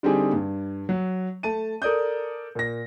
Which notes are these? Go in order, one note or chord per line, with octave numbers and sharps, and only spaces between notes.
D3 G3 C4 D#4 G4 G#4
G2
F#3
A3 A5 D#7
A4 A#4 D5 D#6 G6
A#2 A#6